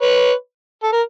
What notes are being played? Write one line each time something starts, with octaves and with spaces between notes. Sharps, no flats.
B4 C#5
A4
A#4